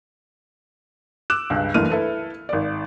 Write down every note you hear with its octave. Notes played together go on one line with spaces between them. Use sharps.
D6 E6 F#6 E7
C#2 G2
F#1 G2 E3 A3 F6 D#7
E4 A4 B4
G#1 D5